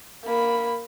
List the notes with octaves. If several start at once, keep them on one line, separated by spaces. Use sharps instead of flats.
A#3 B5